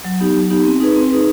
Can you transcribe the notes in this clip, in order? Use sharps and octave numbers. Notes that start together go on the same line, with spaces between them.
F#3
B3 D#4 G4
F#3
B3 D#4 G4
C4
D#4 G#4 B4
C4
D#4 G#4 B4